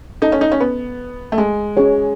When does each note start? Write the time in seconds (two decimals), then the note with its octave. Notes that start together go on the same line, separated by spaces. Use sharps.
0.22 D#4 A4 D#5 A5
0.32 C#4
0.41 D#4
0.52 C#4
0.60 B3
1.32 A3
1.38 G#3
1.77 C#4 G#4 C#5